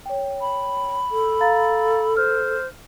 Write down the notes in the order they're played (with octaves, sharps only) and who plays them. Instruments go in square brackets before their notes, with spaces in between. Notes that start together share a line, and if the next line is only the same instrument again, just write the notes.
[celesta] C#5 G5
[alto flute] B5
[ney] A4
[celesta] F5 A#5 A6
[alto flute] C5 [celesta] F6